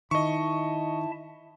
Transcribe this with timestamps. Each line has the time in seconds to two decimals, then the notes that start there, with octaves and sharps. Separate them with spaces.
0.11 D#3 E4 D#5 E5 A5 C#6